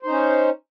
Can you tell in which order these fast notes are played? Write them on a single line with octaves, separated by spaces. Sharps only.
C5 D#4 C#4